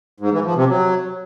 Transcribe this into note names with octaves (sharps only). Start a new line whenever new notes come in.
G#2
E3
F3
C3
F#3